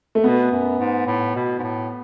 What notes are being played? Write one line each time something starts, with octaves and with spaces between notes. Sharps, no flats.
A3
B2 B3
F#2
G#2
A2
B2
G#2
A2